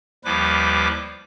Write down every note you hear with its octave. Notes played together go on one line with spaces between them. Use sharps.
D#2 F3 G3 E4 B4 D6